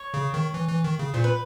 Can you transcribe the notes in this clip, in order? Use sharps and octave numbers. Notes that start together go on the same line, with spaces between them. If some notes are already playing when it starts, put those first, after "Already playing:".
Already playing: C#5
C#3
D#3
E3
E3
D#3
C#3
A#2 C5
B4